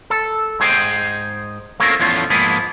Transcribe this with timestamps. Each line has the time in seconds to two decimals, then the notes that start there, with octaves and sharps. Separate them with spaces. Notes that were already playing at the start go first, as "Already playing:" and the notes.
0.10 A4
0.60 G#2 G#4 C5 D#5 G5
1.80 A3 A#3 C4 C#4 F4 A#4
2.00 E2 A2 F3 C#4 F4
2.30 G#2 F3 A#3 B3 E4 G#4